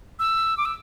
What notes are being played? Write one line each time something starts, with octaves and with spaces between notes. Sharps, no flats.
E6
D6
E6